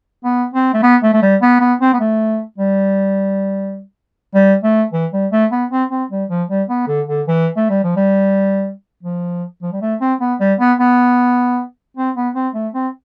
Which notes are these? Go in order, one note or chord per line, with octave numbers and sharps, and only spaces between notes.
B3
C4
A3
B3
A3
A3
G3
B3
B3
C4
B3
A3
G3
G3
A3
E3
G3
A3
B3
C4
C4
G3
F3
G3
B3
D3
D3
E3
A3
G3
F3
G3
F3
F3
G3
A3
C4
B3
G3
B3
B3
C4
B3
C4
A3
C4